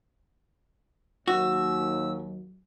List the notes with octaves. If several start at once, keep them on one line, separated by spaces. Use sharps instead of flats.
D#2 F#3 F#4 E6